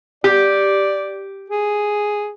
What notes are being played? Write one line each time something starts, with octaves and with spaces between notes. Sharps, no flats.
G4 D5
G#4